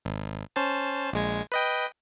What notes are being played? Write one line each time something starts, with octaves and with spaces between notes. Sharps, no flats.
G#1
C#4 C5 A5
A#1 G#3 G#6
B4 D#5 G5